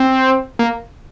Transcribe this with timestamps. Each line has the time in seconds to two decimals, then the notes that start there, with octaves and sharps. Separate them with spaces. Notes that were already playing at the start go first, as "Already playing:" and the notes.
Already playing: C4
0.59 A#3